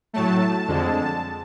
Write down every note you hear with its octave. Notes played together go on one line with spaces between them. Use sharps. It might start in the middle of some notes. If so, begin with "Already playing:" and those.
A2 F#3 A3 A5
F2 D3 G#3